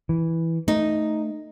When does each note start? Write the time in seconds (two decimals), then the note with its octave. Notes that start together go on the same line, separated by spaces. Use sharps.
0.09 E3
0.68 A3 D#4